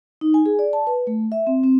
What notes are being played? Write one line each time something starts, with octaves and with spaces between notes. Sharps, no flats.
D#4
G#5
G#4
D5
A5
B4
A3
E5
C4
C4